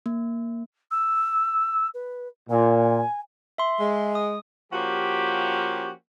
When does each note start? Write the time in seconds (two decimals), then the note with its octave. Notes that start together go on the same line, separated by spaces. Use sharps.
0.06 A#3
0.91 E6
1.94 B4
2.50 A#2 G#5
3.58 E5 C6
3.80 G#3
4.15 D#6
4.73 F3 A#3 C#4 F#4 G4